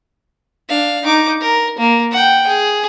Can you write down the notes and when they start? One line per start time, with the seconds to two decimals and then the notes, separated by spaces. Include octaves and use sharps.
0.69 D4 F5
1.04 D#4 D6
1.41 A#4
1.79 A#3
2.11 F#5 G5
2.47 G#4